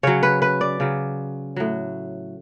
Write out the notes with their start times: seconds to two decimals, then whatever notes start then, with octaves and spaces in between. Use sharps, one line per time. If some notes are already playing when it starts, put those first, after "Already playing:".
0.03 C#3 F#3 C#5
0.23 B4
0.42 B4
0.61 D5
0.80 C#3 F#3
1.56 A2 F#3